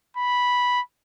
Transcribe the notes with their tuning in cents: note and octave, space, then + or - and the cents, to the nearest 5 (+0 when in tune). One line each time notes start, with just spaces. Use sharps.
B5 -5